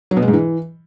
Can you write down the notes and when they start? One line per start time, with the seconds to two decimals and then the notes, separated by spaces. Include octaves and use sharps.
0.11 F#3
0.17 B2
0.22 G#3
0.28 G#2
0.33 E3